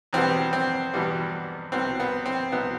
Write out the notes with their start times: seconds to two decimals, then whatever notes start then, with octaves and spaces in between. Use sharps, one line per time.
0.13 E2 B2 G3 B3 C4
0.53 C4
0.93 E2 B2 G3 B3
1.72 C2 B2 B3 C4
2.00 B3
2.25 C4
2.52 C2 B2 B3